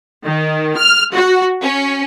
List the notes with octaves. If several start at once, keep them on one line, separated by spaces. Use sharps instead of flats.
D#3
F6
F#4
C#4